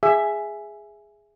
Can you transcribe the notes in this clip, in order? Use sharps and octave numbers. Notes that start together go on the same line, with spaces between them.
G#4 E5